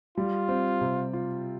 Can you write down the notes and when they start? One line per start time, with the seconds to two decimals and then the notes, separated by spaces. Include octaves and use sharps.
0.17 G3 F4
0.48 C4
0.81 C3
1.13 F4